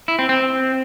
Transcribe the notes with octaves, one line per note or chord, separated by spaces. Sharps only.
E4
C4
C4